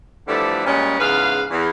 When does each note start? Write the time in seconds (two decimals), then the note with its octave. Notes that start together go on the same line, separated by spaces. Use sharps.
0.27 D3 E3 F3 G3 A3 D4
0.65 A#2 G3 G#3 C#4
0.99 E2 G#2 C#3 B4 F5
1.50 E2